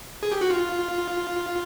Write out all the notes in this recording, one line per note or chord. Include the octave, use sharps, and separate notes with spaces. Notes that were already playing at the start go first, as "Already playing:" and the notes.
G#4
G4
F#4
F4